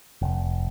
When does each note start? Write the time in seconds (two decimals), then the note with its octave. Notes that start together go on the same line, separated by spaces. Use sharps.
0.22 F1